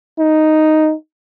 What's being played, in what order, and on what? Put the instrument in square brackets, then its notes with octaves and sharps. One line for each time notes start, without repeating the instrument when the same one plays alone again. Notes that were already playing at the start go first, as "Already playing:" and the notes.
[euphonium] D#4